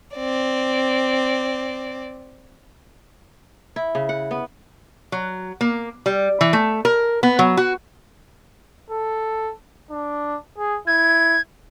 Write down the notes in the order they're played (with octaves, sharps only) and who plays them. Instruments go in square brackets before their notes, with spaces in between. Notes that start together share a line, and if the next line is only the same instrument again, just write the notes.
[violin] C4 D5
[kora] E4
C#3
F#5
B3
[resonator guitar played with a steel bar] F#3
A#3
G3
E3
A3
A#4
B3
F#3
F#4
[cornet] A4
D4
G#4
[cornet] E4 [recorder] G#6